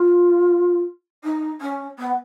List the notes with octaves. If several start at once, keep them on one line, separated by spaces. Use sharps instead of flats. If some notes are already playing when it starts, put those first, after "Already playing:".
Already playing: F4
D#4
C#4
B3